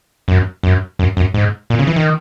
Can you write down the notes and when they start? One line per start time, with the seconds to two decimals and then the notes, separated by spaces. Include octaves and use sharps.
0.28 F#2
0.63 F#2
0.99 F#2
1.17 F#2
1.34 G#2
1.70 A#2
1.79 C#3
1.87 E3
1.96 D#3